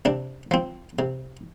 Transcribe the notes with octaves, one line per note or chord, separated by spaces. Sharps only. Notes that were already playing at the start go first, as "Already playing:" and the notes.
C3 D4
F3 C4
C3